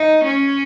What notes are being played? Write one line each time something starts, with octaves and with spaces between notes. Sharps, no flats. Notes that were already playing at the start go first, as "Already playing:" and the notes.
Already playing: D#4
C#4